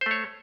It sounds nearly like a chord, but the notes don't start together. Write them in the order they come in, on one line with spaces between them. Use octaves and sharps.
C5 A3 C#5